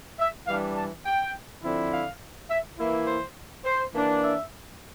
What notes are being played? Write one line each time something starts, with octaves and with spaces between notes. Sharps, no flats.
E5
E3 G3 D4 F5
A5
G5
D3 F3 C4 E4
F5
E5
E3 A#3 E4
C5
C5
E3 A#3 D4
E5